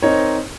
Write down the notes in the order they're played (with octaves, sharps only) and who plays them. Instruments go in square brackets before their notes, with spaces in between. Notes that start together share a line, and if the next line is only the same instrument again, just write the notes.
[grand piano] C4 D#4 A#4 C#5